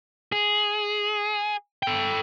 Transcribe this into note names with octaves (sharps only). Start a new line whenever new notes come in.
G#4
A4 G5